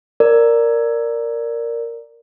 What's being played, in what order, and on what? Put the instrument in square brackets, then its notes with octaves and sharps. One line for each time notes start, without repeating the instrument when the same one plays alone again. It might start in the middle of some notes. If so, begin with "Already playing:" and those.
[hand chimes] A#4 D5